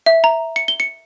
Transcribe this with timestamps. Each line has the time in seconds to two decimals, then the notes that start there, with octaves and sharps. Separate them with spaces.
0.06 E5
0.24 A#5
0.56 C#7
0.68 G7
0.80 C#7